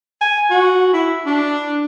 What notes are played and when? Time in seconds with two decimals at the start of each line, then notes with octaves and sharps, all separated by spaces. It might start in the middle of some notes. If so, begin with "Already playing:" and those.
0.21 G#5
0.50 F#4
0.93 E4
1.26 D4